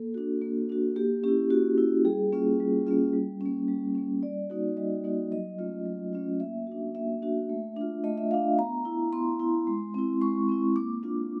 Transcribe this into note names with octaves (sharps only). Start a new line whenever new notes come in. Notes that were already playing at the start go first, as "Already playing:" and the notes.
Already playing: A#3 A4
D4 F#4
A#3
D4 F#4
A#3 G4
C#4 E4 G4
A#3 F#4
C#4 E4
G3 G#4
A#3 C#4 F4
G3
A#3 C#4 F4
G3
A#3 C#4
G3
A#3 C#4
G3 D5
A#3 D#4 F#4
G3 D#5
A#3 D#4 F#4
F#3 D#5
A3 C#4 F4
F#3
A3 C#4 F4
A#3 E5
D4 F#4
A#3 E5
D4 F#4
A3
D4 F4
A3 D#5
E5
D4 F4 F5
B3 A#5
E4
B3 C6
E4
G#3
C4 E4
G#3 C#6
C4 E4
A#3 D6
D4 F4